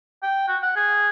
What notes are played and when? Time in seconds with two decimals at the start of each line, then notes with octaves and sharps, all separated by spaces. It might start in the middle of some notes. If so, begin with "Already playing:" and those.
0.23 G5
0.48 F#4
0.62 F#5
0.76 G#4